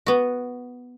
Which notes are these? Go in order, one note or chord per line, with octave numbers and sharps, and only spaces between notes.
B3 F#4